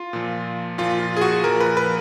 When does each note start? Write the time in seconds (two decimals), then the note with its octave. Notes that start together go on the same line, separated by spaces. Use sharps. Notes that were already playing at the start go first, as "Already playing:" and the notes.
Already playing: F4
0.13 A#2 F3
0.78 A#2 F3 F4
1.00 F4
1.17 G#4
1.21 F#4
1.43 A#2 F3 A#4
1.60 B4
1.77 B4